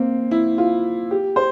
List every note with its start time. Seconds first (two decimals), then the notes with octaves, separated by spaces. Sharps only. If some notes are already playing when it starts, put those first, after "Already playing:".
Already playing: A#3 C4
0.31 E4
0.58 F4
1.11 G4
1.36 C5